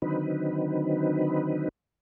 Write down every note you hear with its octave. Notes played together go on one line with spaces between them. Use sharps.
D3 D#3 F#3 C4 D#4 B4